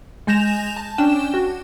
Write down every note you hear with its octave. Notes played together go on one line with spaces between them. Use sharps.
G#3 G#5 G6 A#6 E7 F7
A5
C#4 D4 G5 E7
F#4